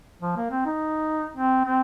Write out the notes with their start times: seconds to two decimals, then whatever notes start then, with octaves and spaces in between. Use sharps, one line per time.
0.22 F3
0.37 A#3
0.51 C4
0.65 D#4
1.36 C4
1.65 C4